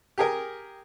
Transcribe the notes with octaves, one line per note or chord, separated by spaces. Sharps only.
G4 G#4 A#4